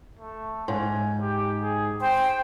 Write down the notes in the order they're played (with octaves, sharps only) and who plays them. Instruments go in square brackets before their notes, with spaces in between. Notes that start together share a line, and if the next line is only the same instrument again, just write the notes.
[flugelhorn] A3
[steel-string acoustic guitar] G#2 [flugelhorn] G#5
[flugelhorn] G4
G#4
[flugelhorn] C5 [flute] G5